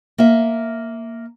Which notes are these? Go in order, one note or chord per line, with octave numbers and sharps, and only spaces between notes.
A#3 E5